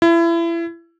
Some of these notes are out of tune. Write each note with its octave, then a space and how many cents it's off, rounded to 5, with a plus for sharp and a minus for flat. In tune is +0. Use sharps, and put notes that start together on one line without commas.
E4 +30